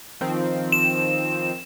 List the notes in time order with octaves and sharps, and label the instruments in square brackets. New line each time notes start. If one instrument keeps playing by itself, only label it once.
[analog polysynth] D#3 F3 C4
[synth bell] E7